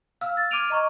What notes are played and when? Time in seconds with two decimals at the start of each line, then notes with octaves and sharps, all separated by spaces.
0.21 F5 E6 F6
0.37 A6
0.51 D6 F6 G#6 D7 D#7 F7
0.70 D#5 A#5 C#6